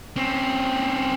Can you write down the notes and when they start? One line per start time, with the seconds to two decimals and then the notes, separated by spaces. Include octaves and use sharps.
0.16 C4 C#4